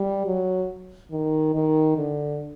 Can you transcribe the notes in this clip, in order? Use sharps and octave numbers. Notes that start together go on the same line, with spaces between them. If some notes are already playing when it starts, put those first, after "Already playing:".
Already playing: G3
F#3
D#3
D#3
D3